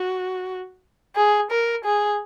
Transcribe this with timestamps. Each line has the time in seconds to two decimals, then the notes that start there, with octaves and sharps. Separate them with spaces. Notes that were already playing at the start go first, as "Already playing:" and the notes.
Already playing: F#4
1.16 G#4
1.51 A#4
1.85 G#4